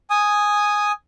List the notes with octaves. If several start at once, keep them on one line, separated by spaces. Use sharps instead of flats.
G#5 D#6